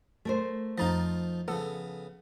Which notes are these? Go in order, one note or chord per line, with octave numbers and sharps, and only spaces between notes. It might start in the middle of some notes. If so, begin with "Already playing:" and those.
A3 A#4 C5
F2 F3 D#4 F4 A#5 A6
C#3 F3 B3 A4